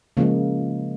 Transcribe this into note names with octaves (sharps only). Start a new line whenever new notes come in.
C#3 F3 G#3 A#3